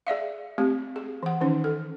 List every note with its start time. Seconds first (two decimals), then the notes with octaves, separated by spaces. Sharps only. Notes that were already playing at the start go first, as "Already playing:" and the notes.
0.07 G#4 D5 E5 F5
0.58 A3 C4 G4
0.96 G#4
1.23 E3 F#5
1.41 D#3 E3 C#4 D#4
1.64 A4